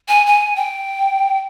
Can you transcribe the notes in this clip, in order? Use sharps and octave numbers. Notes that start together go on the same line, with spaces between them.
G#5
G#5
G5